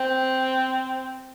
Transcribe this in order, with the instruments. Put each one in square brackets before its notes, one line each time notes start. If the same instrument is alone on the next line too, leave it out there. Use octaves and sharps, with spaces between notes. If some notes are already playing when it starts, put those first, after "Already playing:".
Already playing: [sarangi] C4